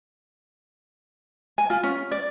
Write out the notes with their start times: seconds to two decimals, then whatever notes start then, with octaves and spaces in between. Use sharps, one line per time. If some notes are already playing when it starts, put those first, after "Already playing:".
1.58 G#5
1.70 F4
1.83 C#4
2.11 D5